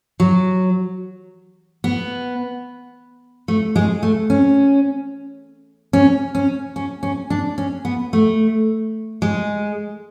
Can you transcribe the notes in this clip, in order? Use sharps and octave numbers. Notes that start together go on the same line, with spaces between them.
F#3
B3
A3
G#3
A3
C#4
C#4
C#4
C#4
C#4
D4
C#4
B3
A3
G#3